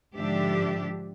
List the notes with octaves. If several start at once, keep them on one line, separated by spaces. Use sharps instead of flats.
G#2 D3 F3 D4 G4 E5